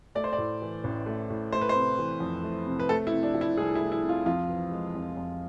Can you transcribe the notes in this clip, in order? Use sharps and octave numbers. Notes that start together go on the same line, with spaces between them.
A3 D5
C5
D5
A2
E3
A1
A3
A2
A3 C5
B4
C5
C3
E3
F2
A3
C3
B4
A3 A4
E4
C3
D4
F3
E4
C2 G#4
E4
A3
E4
C3
F4
F2 F4
E3
G#3
F2
F2